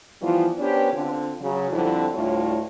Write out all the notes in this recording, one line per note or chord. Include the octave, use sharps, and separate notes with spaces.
E3 F3 G3 B3 F4
B3 C#4 D4 G4 B4 C5
D3 C4 F4
C#3 F#3
F2 D3 F3 G3 C4 E4
D2 A2 G3 E4 F4 C#5